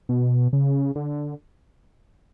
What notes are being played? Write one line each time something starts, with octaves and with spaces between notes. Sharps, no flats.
B2
C#3
D3